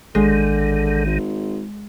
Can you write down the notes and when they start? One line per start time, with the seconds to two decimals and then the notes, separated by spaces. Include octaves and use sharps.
0.15 A1 D3 D#3 G#3
1.05 G#1